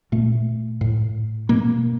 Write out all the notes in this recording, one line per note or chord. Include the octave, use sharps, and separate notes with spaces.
A#2 A3
A2
B2 A#3